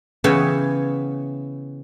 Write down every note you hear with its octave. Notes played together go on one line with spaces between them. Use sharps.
C#3 E3 B3 C#5 E5 G5